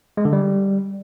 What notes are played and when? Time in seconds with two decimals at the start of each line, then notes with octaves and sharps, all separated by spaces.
0.17 G#3
0.25 D3
0.33 G3